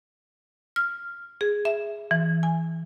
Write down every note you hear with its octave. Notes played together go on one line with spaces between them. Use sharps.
F6
G#4
E5
E3
G#5